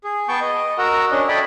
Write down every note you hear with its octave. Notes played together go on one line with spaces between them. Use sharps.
G#4
B3 G5 A5 C#6 G6
D#5
F#4 A#4 F#5 A#5 E6
C#4 D4 D#5
A4 C#5 D#5 E5 G5 B5